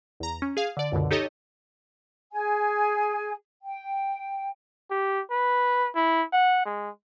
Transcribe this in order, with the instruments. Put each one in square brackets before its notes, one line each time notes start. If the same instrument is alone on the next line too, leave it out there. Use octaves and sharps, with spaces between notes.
[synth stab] E2 A#5
C#4
G#4 F5
D3 D5
C#2 F#2 B2 D3
D#4 G4 A4 C#5 D#5
[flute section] G#4 G#5
G5
[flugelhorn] G4
B4
E4
F#5
G#3